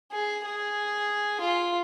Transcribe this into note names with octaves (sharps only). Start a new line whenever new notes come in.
G#4
G#4
F4